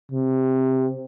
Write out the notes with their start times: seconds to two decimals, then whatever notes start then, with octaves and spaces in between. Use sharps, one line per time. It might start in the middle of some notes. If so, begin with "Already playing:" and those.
0.12 C3